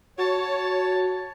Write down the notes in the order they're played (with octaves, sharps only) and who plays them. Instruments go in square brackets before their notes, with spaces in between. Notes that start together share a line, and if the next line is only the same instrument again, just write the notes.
[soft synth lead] F#4 [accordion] C#5 [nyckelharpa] A5